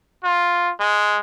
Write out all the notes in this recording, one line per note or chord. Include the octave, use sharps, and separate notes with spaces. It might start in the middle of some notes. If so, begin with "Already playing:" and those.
F4
G#3